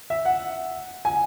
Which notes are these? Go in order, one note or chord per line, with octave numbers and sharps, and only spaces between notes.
E5
F#5
G#5